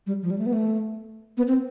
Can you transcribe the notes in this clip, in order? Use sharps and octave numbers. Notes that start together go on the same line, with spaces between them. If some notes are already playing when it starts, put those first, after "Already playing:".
G3
F3
G3
A3
B3
A3
B3
C4